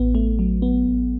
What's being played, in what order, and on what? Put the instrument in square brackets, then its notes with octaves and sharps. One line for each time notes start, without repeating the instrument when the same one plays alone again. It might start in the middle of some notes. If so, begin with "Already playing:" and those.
Already playing: [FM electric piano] A1 B3
A3
F#3
B3
A1